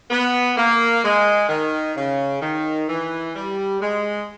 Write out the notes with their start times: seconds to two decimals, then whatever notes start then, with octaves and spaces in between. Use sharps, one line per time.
0.10 B3
0.56 A#3
1.03 G#3
1.49 D#3
1.96 C#3
2.42 D#3
2.89 E3
3.35 G3
3.81 G#3